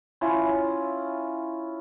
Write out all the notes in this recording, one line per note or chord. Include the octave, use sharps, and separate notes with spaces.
C#4 E4 F4